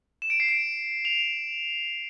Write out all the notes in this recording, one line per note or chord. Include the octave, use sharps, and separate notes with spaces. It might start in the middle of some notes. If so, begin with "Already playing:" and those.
E7
D7
C7
D7
F7